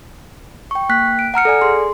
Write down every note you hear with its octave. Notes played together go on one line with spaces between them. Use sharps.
G5 C#6
A#3 G5 F#6 B6
D7
F#5 A#5 F6 C#7
A4 D5 G#5
G#4 C6